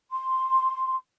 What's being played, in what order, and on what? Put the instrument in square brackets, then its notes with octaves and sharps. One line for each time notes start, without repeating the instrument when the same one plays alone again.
[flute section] C6